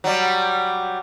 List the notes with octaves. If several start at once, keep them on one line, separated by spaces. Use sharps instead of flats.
F#3 G3